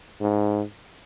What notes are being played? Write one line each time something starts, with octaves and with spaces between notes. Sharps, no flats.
G#2